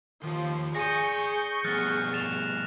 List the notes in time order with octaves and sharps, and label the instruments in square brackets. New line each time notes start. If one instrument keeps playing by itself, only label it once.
[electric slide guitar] D#3 G4 [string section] F3
[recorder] G#4 [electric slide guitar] D5 G#5 [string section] C#6 G6 [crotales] A#6 D#7
[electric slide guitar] F3 G3 B3 [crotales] F6 F#6 A6
[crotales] A6 E7 F7